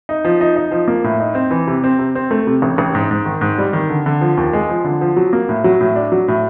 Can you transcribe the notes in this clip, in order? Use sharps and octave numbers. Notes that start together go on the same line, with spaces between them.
D#4
F3
D#4
D#4
F3
A#3
A2
D#4
C4
E3
C3
C4
C3
C4
A3
C3
A1
A1
G#2
G#2
D#3
G#2
G3
D#3
D3
D3
F3
D#2
G#3
F3
D3
F3
F#3
A#3
A2
F#3
A2
D4
F#3
A2